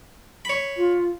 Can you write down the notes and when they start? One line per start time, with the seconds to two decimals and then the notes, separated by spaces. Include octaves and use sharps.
0.45 C#5 B5
0.76 F4